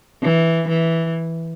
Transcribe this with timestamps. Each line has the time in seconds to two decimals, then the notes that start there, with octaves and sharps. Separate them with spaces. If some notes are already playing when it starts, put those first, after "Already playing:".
0.23 E3
0.68 E3